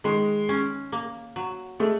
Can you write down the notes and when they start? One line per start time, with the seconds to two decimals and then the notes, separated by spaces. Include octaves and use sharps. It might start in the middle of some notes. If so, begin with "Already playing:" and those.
0.04 D#3 G#3
0.49 C#4
0.92 A#3
1.36 F#3
1.80 G#3 A3